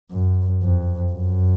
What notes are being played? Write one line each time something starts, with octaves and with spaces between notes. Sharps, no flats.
F#2
F2
F#2